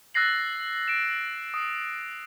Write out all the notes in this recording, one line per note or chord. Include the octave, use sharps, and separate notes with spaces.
E6 F#6 A6 A#6 C7 F#7
D7 E7
D#6